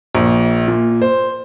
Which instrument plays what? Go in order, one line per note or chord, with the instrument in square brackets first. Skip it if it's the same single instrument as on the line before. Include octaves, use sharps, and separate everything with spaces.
[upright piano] A#1
A#2
C5